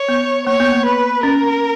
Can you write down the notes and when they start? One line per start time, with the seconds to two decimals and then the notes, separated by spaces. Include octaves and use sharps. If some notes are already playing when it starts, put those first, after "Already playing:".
Already playing: C#5
0.09 B3
0.47 A#3 C#5
0.60 B3
0.72 A#3
0.85 B4
1.23 C#4 A#4